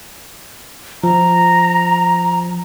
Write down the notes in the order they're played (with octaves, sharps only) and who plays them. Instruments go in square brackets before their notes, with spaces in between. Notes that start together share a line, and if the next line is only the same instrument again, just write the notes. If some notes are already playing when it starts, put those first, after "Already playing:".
[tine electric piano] F3 [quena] A#5